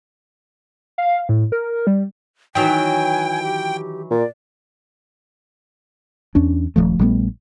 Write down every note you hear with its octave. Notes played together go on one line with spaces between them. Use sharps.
F5
A2
A#4
G3
D#3 E3 F#3 G5 G#5
G4
A#2 D5
E2 C#4 D4
D#1 E2 F3 A3
A#1 G3 A3 B3